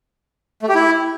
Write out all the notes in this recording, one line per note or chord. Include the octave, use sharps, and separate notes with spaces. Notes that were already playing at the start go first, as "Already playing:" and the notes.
A3
G4
E4